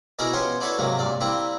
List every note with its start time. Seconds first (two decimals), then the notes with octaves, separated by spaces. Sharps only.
0.19 B2 D#4 E4 G#4 A#4 D5
0.33 B3 C#4 F4 G4 C5 C#5
0.60 D4 E4 F#4 A4 B4 C#5
0.78 G#2 C3 F#3 A#3
0.99 G2 A#2 D5
1.21 G3 A#3 C4 E4